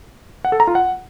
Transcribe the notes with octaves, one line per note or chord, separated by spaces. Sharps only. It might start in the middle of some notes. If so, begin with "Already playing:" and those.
F#5
A4
A#5
F4
F#5